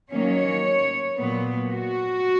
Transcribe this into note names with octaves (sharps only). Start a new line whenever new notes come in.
D#3 F#3 A#3 C#4 C#5
A#2 F#3 B3
F#4